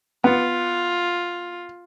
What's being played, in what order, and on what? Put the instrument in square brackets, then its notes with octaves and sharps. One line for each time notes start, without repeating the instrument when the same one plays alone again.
[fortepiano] B3 [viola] F4